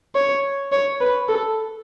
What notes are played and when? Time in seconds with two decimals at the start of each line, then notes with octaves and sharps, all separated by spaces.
0.15 C#5
0.72 C#5
1.01 B4
1.29 A4